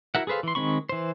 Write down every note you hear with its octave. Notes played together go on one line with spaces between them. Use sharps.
E4 F#4 A#4 E5 F#5
G#4 A4 B4 C5 F5
E3 C6
D#3 G#3 C4 B5 C#6
E3 C5